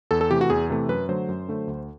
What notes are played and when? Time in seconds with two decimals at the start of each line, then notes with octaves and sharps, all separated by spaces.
0.11 E2 A4
0.21 A4
0.30 C3 E3 A3 G4
0.41 F#4
0.50 E2 G#4
0.70 C3 E3 A3
0.89 F#2 B4
1.09 D3 F#3 A3 C5
1.29 F#2
1.49 D3 F#3 A3
1.67 D2